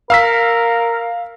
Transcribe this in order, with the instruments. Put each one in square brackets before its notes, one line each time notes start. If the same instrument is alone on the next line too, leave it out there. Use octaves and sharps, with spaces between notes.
[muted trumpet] A#4 [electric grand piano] F5 E6 B6